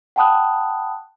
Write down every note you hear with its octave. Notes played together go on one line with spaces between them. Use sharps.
F#5 G5 A5 B5 D#6 F#6